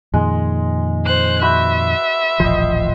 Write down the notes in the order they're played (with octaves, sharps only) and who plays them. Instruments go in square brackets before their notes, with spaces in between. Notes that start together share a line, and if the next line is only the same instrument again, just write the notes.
[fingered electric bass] F2 A#2 D#3 [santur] G#3
[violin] C5 F#6
[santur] F#4 B4 C5 [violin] E5
[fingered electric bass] D#1 A1 F3 [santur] C5 D#5